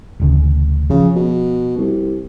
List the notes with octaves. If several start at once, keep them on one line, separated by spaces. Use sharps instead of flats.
E1 D2 C#3
C#3 F3
B2
C2